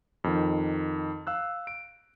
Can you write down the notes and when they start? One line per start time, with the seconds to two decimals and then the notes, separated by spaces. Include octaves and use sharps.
0.24 F2 D#3
1.27 F5 E6 F#6
1.67 D7